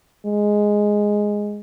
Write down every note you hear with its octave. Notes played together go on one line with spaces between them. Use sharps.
G#3